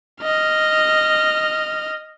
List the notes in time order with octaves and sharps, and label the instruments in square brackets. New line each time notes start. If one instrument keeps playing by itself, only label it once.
[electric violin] D#5 F6